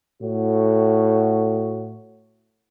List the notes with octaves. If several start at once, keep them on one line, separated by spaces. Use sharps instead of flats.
A2 F#4